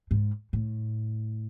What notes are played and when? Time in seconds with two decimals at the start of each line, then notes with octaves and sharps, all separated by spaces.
0.11 G#2
0.53 A2